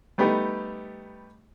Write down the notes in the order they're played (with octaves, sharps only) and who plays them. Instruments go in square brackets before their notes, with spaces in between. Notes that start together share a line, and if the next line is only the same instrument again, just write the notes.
[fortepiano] G3 A3 B3 D#4 G4